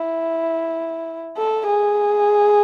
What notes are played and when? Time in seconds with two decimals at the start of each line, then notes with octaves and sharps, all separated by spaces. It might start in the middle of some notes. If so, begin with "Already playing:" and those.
Already playing: E4
1.38 A4
1.67 G#4